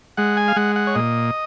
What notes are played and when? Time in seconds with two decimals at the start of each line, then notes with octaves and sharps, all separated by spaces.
0.17 G#3 F#5
0.37 G#5
0.48 F5
0.56 G#3 F#5
0.76 F#5
0.87 C#5
0.95 A#2 D#5